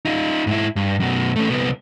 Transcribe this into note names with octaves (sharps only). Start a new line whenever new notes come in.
D#4 F4
G#2 E4
G2
F#2 B2
A3 C#4
C2 B3